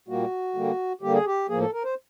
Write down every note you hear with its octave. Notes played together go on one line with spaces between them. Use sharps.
A#2 G3 A#3 F#4
D3 G3 A#3
D3 G3 A#3 G4
G#4
G4
A2 F3 A#3 G#4
A4
A#4
C5